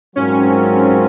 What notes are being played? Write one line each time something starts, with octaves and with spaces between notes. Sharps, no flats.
G#2 F#3 C4 C#4 F4 A#4